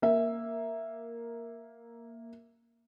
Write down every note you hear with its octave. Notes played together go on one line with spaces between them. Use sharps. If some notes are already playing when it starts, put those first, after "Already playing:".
A#3 E5